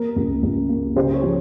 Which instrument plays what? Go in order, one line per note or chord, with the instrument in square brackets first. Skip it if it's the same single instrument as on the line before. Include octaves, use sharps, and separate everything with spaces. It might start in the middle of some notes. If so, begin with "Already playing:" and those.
Already playing: [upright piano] A#3 A#4
C#2
C#2
A#3
C#3 C5
C#5
F3